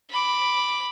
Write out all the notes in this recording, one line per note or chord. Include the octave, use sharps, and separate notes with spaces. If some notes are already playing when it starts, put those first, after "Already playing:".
B5 D6